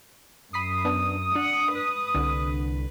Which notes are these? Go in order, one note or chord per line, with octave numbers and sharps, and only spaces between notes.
F#2 B5 D#6 B6 C7
B3 D4
D4 F#5
B4
C2 D3